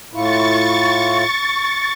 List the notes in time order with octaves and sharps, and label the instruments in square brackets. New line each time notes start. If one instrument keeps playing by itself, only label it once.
[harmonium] A2 E4 F4 [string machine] C#6 A6